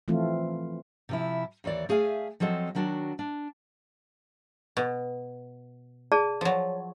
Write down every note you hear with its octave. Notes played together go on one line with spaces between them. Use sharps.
E3 F3 A3 C4 F4
C3 F3 E4
D#2 E3 C#5 D5
A3 G#4 E5 F5 G#5
F3 F#3 C4 A4 D#5
D#3 F#3 D4 F#4
D4
B2
G#4 D5 A5
F3 F#3